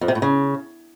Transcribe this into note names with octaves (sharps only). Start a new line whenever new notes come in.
F2
C3
A2
C#3